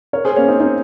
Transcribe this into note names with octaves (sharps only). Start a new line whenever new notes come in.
A#4 C#5
G#4 C5
A#3 C#4
C4 D#4
C4 D#4